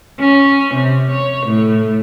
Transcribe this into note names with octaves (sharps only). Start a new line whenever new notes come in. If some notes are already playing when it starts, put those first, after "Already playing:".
C#4
C3
C#5
A2